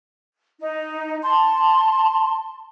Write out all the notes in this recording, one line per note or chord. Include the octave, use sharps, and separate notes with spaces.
D#4
A5 C6